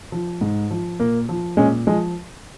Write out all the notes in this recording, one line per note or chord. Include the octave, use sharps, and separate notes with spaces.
F3
G#2
F3
A#2 A#3
F3
A#2 G#3 C#4
F3 G#3